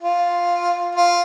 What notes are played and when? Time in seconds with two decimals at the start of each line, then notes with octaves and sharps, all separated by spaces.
0.01 F4
0.95 F4